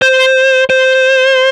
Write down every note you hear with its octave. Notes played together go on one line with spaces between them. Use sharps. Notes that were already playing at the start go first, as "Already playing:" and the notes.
C5
C5